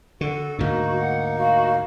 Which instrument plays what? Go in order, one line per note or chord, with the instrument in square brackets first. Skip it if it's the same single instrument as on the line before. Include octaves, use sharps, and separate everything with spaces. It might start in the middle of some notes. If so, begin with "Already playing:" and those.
[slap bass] D3 [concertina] F#4 [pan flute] A4
[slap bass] D2 G#2 [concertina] A#3 D#4 [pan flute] F#4
[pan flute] F#5
[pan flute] F#4 [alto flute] F5